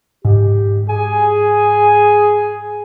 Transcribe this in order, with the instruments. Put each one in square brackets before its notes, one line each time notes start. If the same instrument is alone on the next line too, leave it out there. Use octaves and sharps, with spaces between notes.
[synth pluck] G#2 [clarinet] G4
[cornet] G#4 [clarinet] G#5